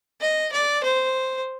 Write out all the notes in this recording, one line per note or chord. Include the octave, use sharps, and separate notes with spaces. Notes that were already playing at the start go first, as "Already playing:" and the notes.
D#5
D5
C5